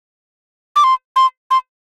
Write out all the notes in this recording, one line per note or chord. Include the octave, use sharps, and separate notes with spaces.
D6
C6
C6
C6